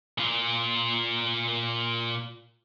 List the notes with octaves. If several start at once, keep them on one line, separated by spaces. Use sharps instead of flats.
A#2 F4